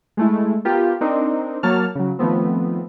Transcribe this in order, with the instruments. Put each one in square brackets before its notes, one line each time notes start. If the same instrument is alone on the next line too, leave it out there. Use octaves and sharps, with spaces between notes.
[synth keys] G#3 A3 E4
B3 F4 G4 A#4
C4 D4 D#4 A#4
F#3 A#3 C#5 A5 F6
C#3 F#3
D#3 F3 A3 B3 C4